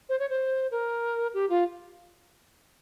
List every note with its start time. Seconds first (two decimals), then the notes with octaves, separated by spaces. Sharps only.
0.09 C5
0.19 C#5
0.30 C5
0.71 A#4
1.34 G4
1.50 F4